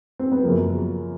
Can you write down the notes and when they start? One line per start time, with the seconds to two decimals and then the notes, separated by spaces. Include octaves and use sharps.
0.19 C4
0.32 B3
0.43 F#2 C#3 F3 A#3